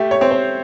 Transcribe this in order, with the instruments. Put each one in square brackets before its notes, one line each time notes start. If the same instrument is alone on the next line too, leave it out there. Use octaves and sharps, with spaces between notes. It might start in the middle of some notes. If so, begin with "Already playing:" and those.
Already playing: [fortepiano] A3 [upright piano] G4
[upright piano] C#5
[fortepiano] C4 [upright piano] C#5
[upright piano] C5